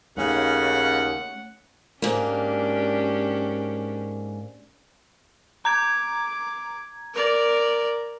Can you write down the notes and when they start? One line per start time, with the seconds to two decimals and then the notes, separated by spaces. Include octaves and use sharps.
0.17 D#2 C#3 A3 C#4 D#4 F#5
2.02 G#2 A#3 C#4 D4 G4
5.65 A#5 D6 G#6
7.14 A#4 D5